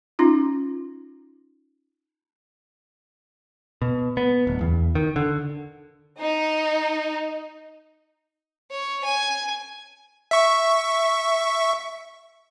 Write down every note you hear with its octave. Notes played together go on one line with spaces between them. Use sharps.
C#4 D#4 F4
B2
B3
D1
E2
D#3
D3
D#4
C#5
G#5
E5 C#6